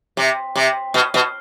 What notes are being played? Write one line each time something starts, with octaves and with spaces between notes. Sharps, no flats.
C3
C3
B2
B2